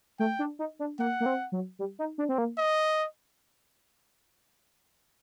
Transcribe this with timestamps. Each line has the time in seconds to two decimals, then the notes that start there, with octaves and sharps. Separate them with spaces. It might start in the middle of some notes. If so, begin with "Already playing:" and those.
0.19 A3 G5
0.39 D4
0.59 D#4
0.79 D4
0.99 A#3 F#5
1.20 A#3
1.26 C4
1.52 F#3
1.79 G3
1.99 D#4
2.18 D4
2.29 C4
2.38 A#3
2.58 D#5